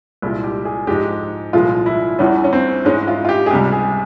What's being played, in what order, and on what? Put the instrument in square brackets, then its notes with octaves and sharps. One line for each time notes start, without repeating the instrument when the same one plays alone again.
[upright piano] C2 A#2 G#3 E4
G4
G#4
G#2 F3 G#3 G4
C2 A#2 F3 G#3 F4
E4
E2 E3 G3 C#4
C#4
C4
G#2 E3 G#3 C#4
F4
F4
G4
G#4
C#2 C3 G3 G4
G#4